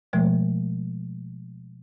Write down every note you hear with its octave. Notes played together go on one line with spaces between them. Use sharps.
B2 F3 G#3 A3